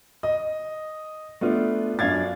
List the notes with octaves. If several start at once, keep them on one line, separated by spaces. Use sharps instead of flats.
D#5
A3 B3 D4 F4
F#2 D4 F5 G#6 A6